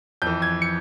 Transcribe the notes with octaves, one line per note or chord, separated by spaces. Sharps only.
F2 E3 G6
G#6
C#7